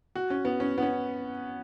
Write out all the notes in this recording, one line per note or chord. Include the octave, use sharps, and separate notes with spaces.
F#4
C#4
B3
C#4
B3
C#4